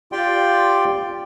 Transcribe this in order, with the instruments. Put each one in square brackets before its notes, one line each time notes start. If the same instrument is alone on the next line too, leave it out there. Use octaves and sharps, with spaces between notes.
[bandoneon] F4 G4 D5 G5 C6